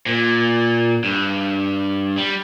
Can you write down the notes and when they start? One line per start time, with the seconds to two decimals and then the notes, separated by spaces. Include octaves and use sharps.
0.06 A#2
1.04 G2
2.17 G3